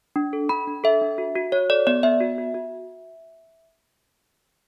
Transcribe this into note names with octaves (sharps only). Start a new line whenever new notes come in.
D4
A4
D4 B5
D4
A4 E5
D4
F#4
F#4
F#4 C#5
A4 D5
B3 D5
B3 E5
F#4
F#4
F#4